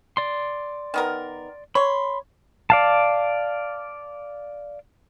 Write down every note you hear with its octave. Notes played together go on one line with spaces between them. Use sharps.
D5 C6
D#3 B3 A#4
C#5 B5 C6
D5 F5 A5